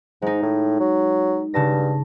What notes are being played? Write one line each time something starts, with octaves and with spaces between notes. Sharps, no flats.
G#2 G#3 D#4
A2
F#3
G2 C#3 A5 A#6